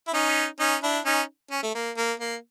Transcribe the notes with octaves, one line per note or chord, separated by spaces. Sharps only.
E4
C#4 D#4
C#4 D#4
D4 E4
C#4 D#4
C#4
A3
A#3
A#3
A#3